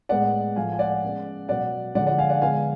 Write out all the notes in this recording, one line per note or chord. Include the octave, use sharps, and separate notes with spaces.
A2 G#3 B3 D5 F#5
A2 F3 A3 F5 G#5
G#5
D5 F#5
C#3 G#3 B3
B2 F#3 B3 D5 F#5
D3 F3 G#3 D5 F#5
D5 F#5
F5 G#5
D5 F#5
D3 G#3 B3 F5 G#5